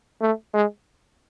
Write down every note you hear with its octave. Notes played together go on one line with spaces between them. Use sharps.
A3
G#3